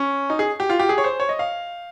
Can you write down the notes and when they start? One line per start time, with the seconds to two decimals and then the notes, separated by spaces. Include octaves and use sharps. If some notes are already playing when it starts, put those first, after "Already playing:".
Already playing: C#4
0.30 D#4
0.39 G#4
0.60 G4
0.70 F4
0.79 G4
0.89 G#4
0.98 C#5
1.04 C5
1.20 C#5
1.29 D#5
1.39 F5